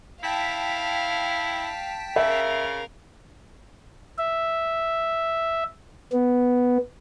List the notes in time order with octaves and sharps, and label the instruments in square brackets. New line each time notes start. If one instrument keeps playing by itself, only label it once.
[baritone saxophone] E4 [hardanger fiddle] F5 [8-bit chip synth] G5 A5 B6
[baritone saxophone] C#3 [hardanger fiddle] A#4 F5 [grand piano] E5
[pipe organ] E5
B3